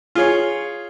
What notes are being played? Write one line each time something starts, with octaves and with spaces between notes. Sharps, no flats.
F4 G#4 C#5